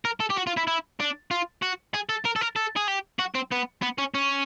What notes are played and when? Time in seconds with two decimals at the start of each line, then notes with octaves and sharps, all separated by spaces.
0.05 A#4
0.20 A4
0.30 G4
0.37 F#4
0.47 F4
0.57 E4
0.67 E4
1.00 D4
1.31 F4
1.63 F#4
1.94 G#4
2.09 A4
2.25 A#4
2.36 A4
2.41 A#4
2.56 A4
2.76 G#4
2.88 G4
3.19 F#4
3.35 C4
3.51 B3
3.82 B3
3.98 C#4
4.14 C#4